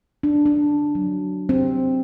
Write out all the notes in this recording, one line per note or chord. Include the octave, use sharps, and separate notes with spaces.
D4
D4
F#3
C4